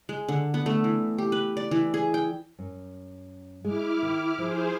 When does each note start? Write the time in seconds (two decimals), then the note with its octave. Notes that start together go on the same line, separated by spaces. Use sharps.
0.09 G#3
0.29 D3
0.54 B3
0.66 A3
0.84 E3
1.18 G4
1.32 B4
1.57 D5
1.71 E3
1.94 G#4
2.14 G5
2.58 F#2
3.65 G#3 E4 D6 F6
4.03 D#3
4.38 F3 G#4 C5